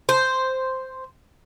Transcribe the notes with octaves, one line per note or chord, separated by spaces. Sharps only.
C5